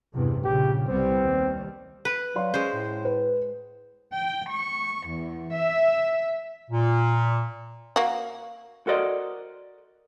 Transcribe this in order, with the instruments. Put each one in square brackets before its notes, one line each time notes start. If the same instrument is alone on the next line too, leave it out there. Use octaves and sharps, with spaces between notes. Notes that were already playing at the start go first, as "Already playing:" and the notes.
[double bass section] E2 G2 C3
[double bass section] A#1 C#3 [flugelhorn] G4
[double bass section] C2 G3 B3 [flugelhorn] C4
[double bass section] D#2 G3
[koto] B4
[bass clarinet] F#3 [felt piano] D5 F5 C6
[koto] G#3 C5 [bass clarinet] C#4
[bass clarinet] A2
[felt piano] B4
[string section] G5
C#6
E2
E5
[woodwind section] A#2
[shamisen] A#3 F#4
[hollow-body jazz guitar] F#4 A4 A#4 C5 D5 D#5